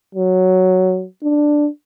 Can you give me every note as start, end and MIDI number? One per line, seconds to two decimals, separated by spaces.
0.15 1.05 54
1.23 1.68 62